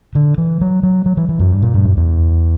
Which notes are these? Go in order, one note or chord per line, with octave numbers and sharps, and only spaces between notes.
D3
E3
F#3
F#3
F#3
E3
E3
F#2
G2
A#2
G2
F#2
E2